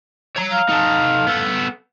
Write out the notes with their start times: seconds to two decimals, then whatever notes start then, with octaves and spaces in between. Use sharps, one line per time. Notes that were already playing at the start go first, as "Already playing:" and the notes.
0.36 C#5 A#5
0.52 F5
0.69 D#4 A4
1.27 B3 A4